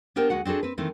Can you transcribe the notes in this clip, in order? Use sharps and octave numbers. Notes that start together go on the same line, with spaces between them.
B3 D4 G4 A#4 C5
D2 G#3 F#4 F#5
C4 D4 F#4 G#4 A4
C4 B4
D#3 E3 A3 C4